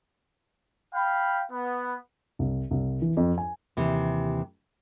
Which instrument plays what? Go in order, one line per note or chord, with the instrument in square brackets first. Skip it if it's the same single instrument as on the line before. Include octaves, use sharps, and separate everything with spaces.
[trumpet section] F5 G5 B5
B3
[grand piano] C2
C2
E3
F2
G#5
[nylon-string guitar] D#2 C3 E3